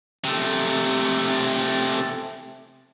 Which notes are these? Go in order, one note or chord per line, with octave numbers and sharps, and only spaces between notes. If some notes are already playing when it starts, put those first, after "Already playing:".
C3 A3